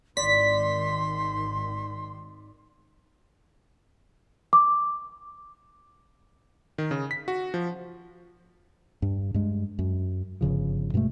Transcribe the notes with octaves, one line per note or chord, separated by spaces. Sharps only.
G#1 D#3 D5 C6 B6
D6
D#3
C#3
B6
F#4
F3
G2
G2 G#3
F#2
G1 D#2 C#3 F3
G2 B2 G#3 A3